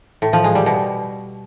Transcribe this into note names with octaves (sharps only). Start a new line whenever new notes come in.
A2
F3
G#3
G3
B2